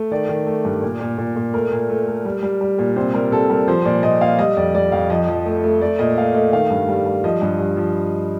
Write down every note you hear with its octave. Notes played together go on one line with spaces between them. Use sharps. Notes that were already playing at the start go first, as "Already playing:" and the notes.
Already playing: A3
D#3 D5
D#3
A3
G2
A#2
A#2
A#2
A#2
A3 A#4
A#2
A3
A3
G3
G3
G3
A#2
C3 C5
G3 A#4
C3 A4
G3 A#4
F3 C5
A#2 D5
A#2 D#5
A#2 F5
G3 D#5
F2 D5
G3 D5
F2 F5
F3 D#5
F3
A3
A3
A3 D5
A#2 D#5
A3 F5
A3 D#5
D#3 F5
G2
G3
G3
F3 D#5
G2
G2
F3